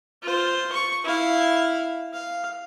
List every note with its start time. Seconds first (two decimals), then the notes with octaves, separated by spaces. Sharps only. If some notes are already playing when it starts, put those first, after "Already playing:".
0.23 F4 C5
0.73 C#6
1.04 E4 F5
2.13 F5